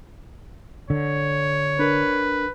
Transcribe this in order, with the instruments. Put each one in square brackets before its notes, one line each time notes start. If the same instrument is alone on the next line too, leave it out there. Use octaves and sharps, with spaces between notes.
[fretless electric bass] D3 [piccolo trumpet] C#5
[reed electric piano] D4 A#4 [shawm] B4